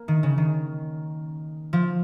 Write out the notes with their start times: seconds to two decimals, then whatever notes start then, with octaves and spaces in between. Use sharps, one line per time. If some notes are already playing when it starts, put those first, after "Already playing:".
Already playing: A#3
0.08 D#3
0.23 C#3
0.38 D#3
1.73 F3